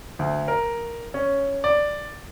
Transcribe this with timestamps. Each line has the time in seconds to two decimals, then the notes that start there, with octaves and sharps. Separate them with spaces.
0.19 D2
0.48 A#4
1.14 C#4
1.64 D5